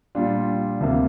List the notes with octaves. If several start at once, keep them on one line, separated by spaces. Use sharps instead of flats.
A#2 G3 D4 F4
D2 C3 A#3